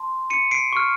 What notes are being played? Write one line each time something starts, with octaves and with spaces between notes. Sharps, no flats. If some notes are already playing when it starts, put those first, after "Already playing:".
Already playing: A5 C6
C#7 D#7
C7 D7
C#6 F6